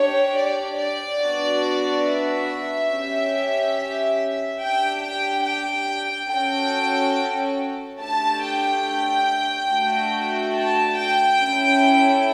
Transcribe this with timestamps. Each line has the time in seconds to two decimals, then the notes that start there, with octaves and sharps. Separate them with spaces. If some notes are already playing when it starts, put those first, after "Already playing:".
Already playing: D4 G4 C#5
0.36 D5
0.78 D5
1.21 B3 D4 F#4
2.06 E5
2.91 C#4 G4
4.61 D4 G4 G5
5.04 G5
5.46 G5
6.31 C#4 F#4 A4 G5
8.01 A3 D4 G4 A5
8.44 G5
9.71 A3 D4 F#4
10.56 A5
10.99 G5
11.42 C#4 E4 A4